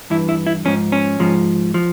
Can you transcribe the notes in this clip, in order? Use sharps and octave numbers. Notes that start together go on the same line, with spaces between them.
G2 E3 E4
E4
E4
G#2 F3 C#4
C#4
G#2 F3
F3